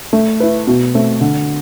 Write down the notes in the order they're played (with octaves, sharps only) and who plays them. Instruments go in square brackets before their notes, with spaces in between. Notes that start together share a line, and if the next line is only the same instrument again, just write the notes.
[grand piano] A3
E4 B4
B2
A3 C4
D3